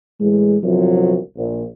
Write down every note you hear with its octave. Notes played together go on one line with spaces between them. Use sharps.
A2 E3 G#3
G1 C2 C3 F3 F#3
A#1